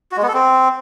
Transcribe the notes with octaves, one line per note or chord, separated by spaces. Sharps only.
F#4
G#3
B3
A4
C4